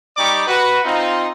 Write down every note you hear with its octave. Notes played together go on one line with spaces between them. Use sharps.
G3 D#4 G4 D5 C#6 D6
F#4 B4
C4 D#4 F4